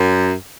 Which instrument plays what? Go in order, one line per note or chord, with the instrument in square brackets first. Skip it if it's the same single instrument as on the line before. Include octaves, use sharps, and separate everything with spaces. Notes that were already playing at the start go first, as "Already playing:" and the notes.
Already playing: [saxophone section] F#2